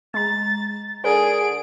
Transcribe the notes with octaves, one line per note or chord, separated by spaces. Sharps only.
G#3 A#5 A6
D3 G#4 A#4 D7